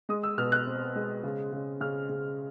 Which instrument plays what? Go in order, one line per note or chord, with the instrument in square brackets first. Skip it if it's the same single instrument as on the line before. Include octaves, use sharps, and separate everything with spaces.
[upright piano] G#3 D#6
E6
B2 F6
F#6
C4
G#3
C#3
C#3
C#3 F6
C#3